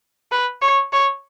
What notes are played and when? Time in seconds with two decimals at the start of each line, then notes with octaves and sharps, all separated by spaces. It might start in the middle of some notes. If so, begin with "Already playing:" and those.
0.32 B4
0.62 C#5
0.92 C#5